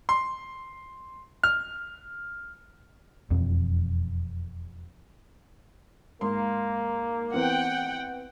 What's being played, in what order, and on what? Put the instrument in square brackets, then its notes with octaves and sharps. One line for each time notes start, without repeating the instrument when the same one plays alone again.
[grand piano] C6
F6
[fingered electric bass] E1 F2 C4
[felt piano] G#2 C6 [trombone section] A#3
[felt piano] E3 B3 C4 [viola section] F#5 G5